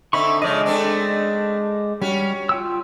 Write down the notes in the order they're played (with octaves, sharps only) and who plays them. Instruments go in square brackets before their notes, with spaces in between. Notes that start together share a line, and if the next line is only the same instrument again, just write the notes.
[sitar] D3 C4 D#4 [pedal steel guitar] E5 B5 C#6
[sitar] C#3 F3 [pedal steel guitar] G#3 D5 D#5
[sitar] A3 C4 D4
[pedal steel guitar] G3 [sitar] C#4 F#4
[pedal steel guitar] F4 G5 E6